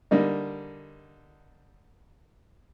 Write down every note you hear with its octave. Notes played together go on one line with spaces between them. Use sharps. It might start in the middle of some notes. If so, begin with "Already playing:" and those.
D3 G3 A#3 D#4